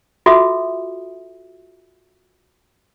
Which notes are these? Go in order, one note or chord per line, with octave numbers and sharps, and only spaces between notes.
F4 F#4 A4 E5 D#6